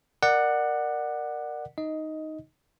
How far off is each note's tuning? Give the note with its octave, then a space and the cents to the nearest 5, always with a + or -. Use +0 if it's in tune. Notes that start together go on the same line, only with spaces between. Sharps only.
A#4 +0 D5 +25 F#5 +0
D#4 +0 D#5 +10